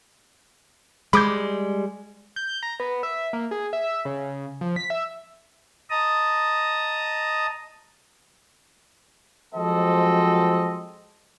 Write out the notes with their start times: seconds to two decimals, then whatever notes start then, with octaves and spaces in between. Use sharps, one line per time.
1.13 G3 G#3 B5 D6 G6
2.36 G6
2.63 A#5
2.80 B3
3.03 E5
3.33 A#3
3.51 G#4
3.73 E5
4.05 C#3
4.61 F3
4.76 B6
4.90 E5
5.90 D#5 A5 A#5 D#6
9.55 F3 F#3 G#3 C4 A4 D#5